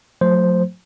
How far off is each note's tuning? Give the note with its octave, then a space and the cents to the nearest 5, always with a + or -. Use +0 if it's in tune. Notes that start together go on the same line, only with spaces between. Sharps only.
F#3 -45 A3 +0 C5 +0